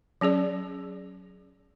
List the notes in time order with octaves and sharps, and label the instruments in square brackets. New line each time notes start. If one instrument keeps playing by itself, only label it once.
[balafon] F#3 C#4 G#4 D5